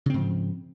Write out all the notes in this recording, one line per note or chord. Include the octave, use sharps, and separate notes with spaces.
G#2 C#3 F3 C4